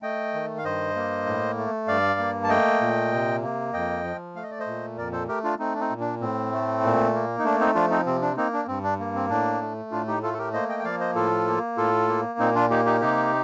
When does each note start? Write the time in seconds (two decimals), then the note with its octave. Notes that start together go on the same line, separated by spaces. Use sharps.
0.02 A3 D#5 G5
0.34 D#3
0.58 F5
0.64 G2 C5 D#5
0.96 A#3
1.26 A2
1.58 A3
1.87 G2 D5 F5
2.19 A#3
2.44 A5
2.49 A3 D#5 G5
2.81 A#2
3.12 C3
3.43 A#3
3.73 F2 D#5 G5
4.04 F3
4.36 A3 F5
4.43 D#5
4.51 D5
4.59 C5 D#5
4.66 A#2
4.97 F2 A#4 D5
5.12 A4 C5
5.28 A3 G4 A#4
5.44 D4 F4
5.59 A3 C4 D#4
5.74 D4
5.79 C4 D#4
5.90 A#2
6.00 D4
6.20 A2 C4
6.52 A3
6.83 A#2
7.13 A#3
7.39 D#4
7.44 A3 D4
7.60 C4 D#4
7.75 F3 D4 F4
7.90 C4 D#4
8.06 C3 C4
8.22 D4
8.37 A#3 C4 D#4
8.53 D4
8.68 G2 C4
8.83 D4
8.99 A#3
9.15 C4
9.30 A2 D4
9.62 A3
9.91 A2 D4 F4
10.08 D#4 G4
10.23 A3 F4 A4
10.34 A4
10.38 G4 A#4
10.53 A#3 C5 D#5
10.69 D#5 G5
10.79 G5
10.84 F3 D5 F5
11.00 C5 D#5
11.15 A2 F4 A4
11.47 A#3
11.77 A2 F4 A4
12.08 A#3
12.39 A#2 C4 D#4
12.55 D4 F4
12.70 A#3 D#4 G4
12.85 D#4 G4
13.01 C3 D#4 G4